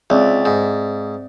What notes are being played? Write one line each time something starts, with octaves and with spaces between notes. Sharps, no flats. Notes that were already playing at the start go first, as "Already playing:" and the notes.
C#2 C4 D5 E5
G#2